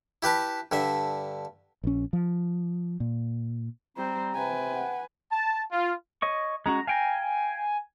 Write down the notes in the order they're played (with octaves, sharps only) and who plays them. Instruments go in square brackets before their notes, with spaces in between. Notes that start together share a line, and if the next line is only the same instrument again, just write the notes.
[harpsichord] E4 G4 B4 A5
G2 D3 E5
[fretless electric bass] A#1 C#4
F3
A#2
[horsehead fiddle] G3 C5 [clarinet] C4 [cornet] A#5
[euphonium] C3 [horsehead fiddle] B4 G#5 [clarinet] G5
[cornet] F#5
[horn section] A5
F4
[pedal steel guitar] C#5 D#5 C#6
[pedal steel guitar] G#3 C#4 F#4 [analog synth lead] A#5
[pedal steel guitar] F5 G5 A#5 [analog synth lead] G#5